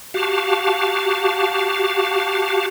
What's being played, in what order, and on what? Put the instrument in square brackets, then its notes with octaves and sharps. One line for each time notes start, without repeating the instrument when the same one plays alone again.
[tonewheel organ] F#4 G4 F5 A5